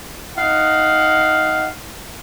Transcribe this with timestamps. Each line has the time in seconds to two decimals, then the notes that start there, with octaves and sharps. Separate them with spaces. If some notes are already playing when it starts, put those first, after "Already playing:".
0.38 D#4 F5 F#5